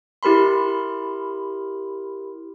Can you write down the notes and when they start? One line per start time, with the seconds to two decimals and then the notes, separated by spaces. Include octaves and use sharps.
0.23 E4 G4 A#4 B5 C6